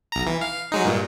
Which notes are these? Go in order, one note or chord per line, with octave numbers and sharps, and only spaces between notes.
B1 A#5
E3
F5
F#3 G#3 D#4
G2 A#2